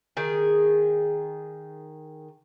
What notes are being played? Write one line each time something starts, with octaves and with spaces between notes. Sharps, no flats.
D#3 G#4